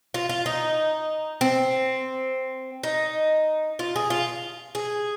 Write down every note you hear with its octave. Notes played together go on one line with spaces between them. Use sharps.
F4
F4
D#4
C4
D#4
F4
G#4
F4
G#4